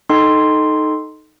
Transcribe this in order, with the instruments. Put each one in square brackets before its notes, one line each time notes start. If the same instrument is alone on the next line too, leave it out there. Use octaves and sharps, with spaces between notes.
[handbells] D#4 A4 D#5 G5 C6